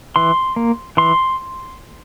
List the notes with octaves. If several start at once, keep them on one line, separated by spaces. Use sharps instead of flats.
E3 C6
A#3
E3 C6